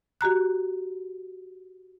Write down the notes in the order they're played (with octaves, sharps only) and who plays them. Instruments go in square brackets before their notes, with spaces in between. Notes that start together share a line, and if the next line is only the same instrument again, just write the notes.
[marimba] F#4 G4 A#5 F#6